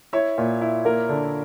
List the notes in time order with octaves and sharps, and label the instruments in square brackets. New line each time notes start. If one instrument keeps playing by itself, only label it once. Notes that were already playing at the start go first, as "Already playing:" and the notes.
[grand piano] E4 [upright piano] C#5 E5
[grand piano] A#2
E4
[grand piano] A#3 [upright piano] A#4
[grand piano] D3